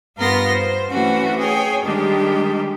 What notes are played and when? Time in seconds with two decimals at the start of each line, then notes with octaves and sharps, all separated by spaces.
0.17 G2 B3 F4 A#4 C6 A#6
0.51 C5
0.90 E3 A3 C4 C#4 F#4
1.38 G#4 C#5 G5 G#5
1.82 D#3 G3 G#3 D4 G4